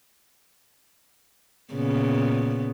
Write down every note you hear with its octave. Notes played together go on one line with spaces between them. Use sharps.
A#2 C#3 B3